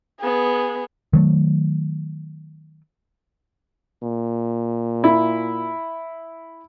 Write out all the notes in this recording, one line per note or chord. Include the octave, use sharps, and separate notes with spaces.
B3 G#4
D#3 F#3 A3
A#2
E4